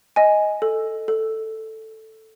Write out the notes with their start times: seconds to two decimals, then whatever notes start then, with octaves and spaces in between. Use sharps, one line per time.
0.16 D#5 G#5
0.62 A4
1.08 A4